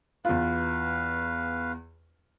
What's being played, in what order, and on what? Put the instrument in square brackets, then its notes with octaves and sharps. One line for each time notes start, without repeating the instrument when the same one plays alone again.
[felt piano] E2 F4 [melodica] B4 F5